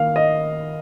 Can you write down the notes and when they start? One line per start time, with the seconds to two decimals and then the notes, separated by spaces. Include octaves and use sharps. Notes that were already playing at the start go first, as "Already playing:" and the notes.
Already playing: D#3 A#3 F5
0.16 D#5